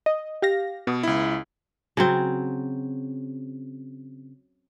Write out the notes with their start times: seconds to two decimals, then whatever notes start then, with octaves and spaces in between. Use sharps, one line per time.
0.06 D#5
0.42 G4 F5 A#6
0.87 B2 B3
1.03 C#2 E4
1.97 C#3 F#3 C4